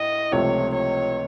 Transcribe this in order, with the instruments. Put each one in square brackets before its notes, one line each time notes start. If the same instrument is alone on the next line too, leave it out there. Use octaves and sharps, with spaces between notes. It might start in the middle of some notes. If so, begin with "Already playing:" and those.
Already playing: [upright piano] A2 [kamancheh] D#5
[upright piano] C#2 C3 F3 A3 [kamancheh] C#5
[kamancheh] C#5